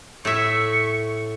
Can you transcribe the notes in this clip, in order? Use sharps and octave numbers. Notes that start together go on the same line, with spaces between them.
A2 E5 C#6